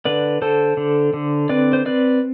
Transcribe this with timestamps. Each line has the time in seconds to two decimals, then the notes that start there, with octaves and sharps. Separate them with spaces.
0.05 D3 B4 D5
0.42 D3 A4 C5
0.77 D3
1.14 D3
1.49 C4 B4 D5
1.73 C5
1.86 C4 B4 D5